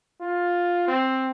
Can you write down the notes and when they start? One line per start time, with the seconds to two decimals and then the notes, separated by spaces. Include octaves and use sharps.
0.21 F4
0.88 C4